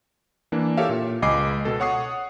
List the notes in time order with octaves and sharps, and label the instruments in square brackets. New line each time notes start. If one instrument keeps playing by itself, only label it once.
[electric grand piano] E3 A#3 D4
G4 A4 A#4 C#5 E5 F5
A#2
C#2 D#5 G#5 B5 D6 C7
B2 A4
C#5 F#5 C#6 D#6 C7